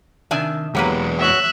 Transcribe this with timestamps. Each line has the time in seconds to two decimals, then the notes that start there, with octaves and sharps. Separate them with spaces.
0.31 C3 D#3 D4 D5 E5 G#5
0.75 E2 F#3 G#3 A#3 G4 B4
1.19 F#4 C#5 E5 F#6